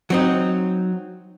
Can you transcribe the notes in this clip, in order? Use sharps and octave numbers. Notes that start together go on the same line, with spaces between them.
F#3 C4 D#4